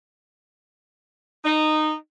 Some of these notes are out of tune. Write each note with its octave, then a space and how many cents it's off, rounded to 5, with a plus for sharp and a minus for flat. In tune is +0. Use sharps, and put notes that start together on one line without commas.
D#4 -15